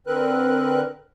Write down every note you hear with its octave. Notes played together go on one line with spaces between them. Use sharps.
D3 C4 A#4 B4 F#6